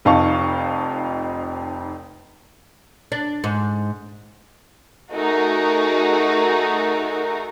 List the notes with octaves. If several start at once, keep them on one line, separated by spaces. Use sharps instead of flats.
F1 F2 D#4 F5 A5 C#6
D4
G#2
A3 D#4 F#4 G#4 A#4